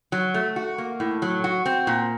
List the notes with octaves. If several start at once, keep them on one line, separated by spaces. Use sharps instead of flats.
F#3
A3
F#4
A#3
A2
F#3
F#4
C4
A#2